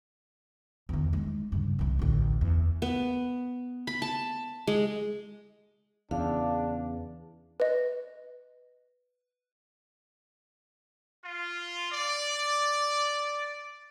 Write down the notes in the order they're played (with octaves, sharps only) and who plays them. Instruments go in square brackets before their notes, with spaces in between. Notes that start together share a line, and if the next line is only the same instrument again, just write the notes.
[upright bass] E2 D#3
G#3 D#4
G2 C#3
C2 E3
A1 D2
E2
[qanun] B3
B5
A5
G#3
[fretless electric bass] E2 C#3 [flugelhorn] D4 [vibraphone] F5
[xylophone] B4 D#5
[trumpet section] F4
D5